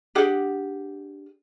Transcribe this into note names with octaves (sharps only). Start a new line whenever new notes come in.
D4 G4 G#4 F#5